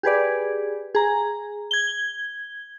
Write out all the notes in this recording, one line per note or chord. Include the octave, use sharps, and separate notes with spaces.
G4 G#4 B4 D5
G#4 A#5
G#6 G7